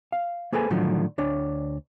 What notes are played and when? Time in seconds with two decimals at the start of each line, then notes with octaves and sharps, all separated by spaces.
0.12 F5
0.52 A#3 G#4 A4 B4 C5 G#5
0.70 A2 D3 D#3 F3 F#3
1.18 D2 D4 C#5